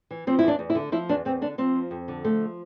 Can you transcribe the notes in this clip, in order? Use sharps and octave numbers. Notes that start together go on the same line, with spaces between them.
E3
F3 C4
E2 E4
D4
E2
E4
D3
F3 E4
E2 D4
E2 C4
D3 D4
F3 C4
F2
F2
D3
F3 A3